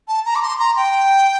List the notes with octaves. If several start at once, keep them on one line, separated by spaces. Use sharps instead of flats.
A5
A#5
D6
C6
A#5
G5